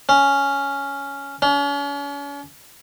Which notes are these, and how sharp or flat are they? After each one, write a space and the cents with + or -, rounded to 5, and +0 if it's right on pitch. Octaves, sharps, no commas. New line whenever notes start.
C#4 +5
C#4 +40